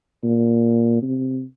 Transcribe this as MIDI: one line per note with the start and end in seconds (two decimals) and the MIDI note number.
0.24 1.02 46
1.02 1.43 48